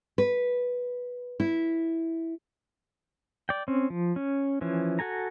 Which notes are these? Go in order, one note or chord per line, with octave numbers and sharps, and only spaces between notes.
B4
E4
D5 G5
C4 C#4
F3
C#4
E3 F3 C#4
F#4 A4 G#5 A#5